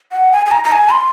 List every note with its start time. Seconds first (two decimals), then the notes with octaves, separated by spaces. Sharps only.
0.12 F#5
0.32 G#5
0.46 G#5
0.51 A#5
0.64 A#5
0.72 G#5
0.91 C6